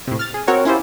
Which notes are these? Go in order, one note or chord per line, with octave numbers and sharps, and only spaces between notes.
A2 C3
F6 A6
G#4
C4 F#4 A#4 C#5
C#4 E4 F4 G4 C5